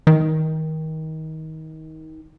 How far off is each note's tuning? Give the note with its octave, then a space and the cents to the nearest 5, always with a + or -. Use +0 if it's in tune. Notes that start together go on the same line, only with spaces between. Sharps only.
D#3 +25